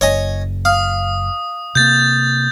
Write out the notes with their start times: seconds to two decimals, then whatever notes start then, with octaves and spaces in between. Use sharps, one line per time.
0.01 F#1 C#5 D#5 G#5
0.65 F5 D#6
1.75 C3 A#3 G6 A6